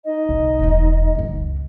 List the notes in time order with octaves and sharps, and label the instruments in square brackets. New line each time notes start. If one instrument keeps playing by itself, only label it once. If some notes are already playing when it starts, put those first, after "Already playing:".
[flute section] D#4 D#5
[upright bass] B1
E1 E2
C#2 F#2